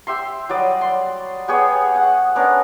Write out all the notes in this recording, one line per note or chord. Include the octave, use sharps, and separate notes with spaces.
G4 E5 C6
F#3 G3 D5 D#5
C6
B3 G4 G#4 C#5
F#5
B3 C#4 D4 A#4